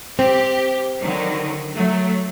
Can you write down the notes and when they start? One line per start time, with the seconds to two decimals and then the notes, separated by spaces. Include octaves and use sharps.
0.19 C4 G4
0.99 D3 D#3 F#3
1.74 F#3 A3